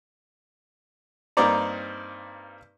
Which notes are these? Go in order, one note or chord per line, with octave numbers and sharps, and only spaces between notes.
G2 A#3 C4 D#4 D5 A#5